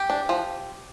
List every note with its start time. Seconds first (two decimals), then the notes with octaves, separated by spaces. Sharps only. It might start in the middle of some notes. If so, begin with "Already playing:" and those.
Already playing: G4
0.10 D4
0.29 F3